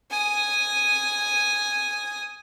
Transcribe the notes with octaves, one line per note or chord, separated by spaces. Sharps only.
G#5 D#6